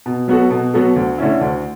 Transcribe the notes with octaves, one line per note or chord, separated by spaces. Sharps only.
B2
F#3 B3 F#4 A4
B2
F#3 B3 F#4 A4
D2
D3 A3 C#4 E4
D2